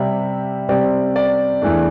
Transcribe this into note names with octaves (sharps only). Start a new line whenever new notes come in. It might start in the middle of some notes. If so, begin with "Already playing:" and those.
Already playing: C3 G3 C4 E5
C3 G3 C4 D5
D5
E2 E3 A3 D4